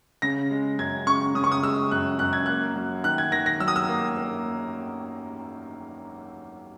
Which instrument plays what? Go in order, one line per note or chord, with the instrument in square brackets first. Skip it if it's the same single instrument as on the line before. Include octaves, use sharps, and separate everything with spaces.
[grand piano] C#3 A#6
G#3
F#2 G#6
C#3 C#6
C#3 D#6
C#6
D#6
G#3 E6
F#2 F#6
F#2 F#6
G#6
A#3 F#6
F#3
D#3 F#6
G#6
D#3 A#6
A#6
F#3 E6
D#6
E6
A#3
A#3